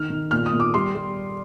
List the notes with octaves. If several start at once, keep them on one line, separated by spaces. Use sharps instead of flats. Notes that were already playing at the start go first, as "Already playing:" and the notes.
Already playing: D#3 F6
D#3
A#2 F6
D#6
A#2
D6
G3 C6
G3